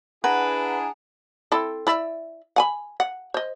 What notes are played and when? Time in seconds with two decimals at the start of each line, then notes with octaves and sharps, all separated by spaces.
0.24 D4 E4 G#4 B4 F#5 G#5 A#5
1.52 C4 E4 A4
1.87 E4 D5 E5
2.56 F#5 G#5 B5
3.00 F#5
3.34 C5 D#5